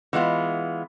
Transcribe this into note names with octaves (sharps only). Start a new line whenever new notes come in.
E3 G#3 B3 F4